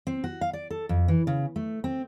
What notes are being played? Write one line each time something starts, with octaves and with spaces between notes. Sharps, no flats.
C4
F#4
F5
D5
A4
F2
E3
C#3
A3
C4